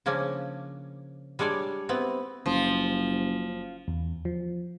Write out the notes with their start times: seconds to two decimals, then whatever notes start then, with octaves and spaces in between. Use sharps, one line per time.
0.06 C#3 F3 A#3 C#4 D4
1.39 G3 G#3 D4 C#5 D5
1.89 B3 C4 E4
2.46 F#1 F3
3.88 E2
4.25 F3